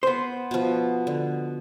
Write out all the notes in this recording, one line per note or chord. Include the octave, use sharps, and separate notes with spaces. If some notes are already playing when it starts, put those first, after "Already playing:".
B3 C5
B2 F3
D3